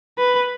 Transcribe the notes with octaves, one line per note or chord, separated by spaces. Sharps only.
B4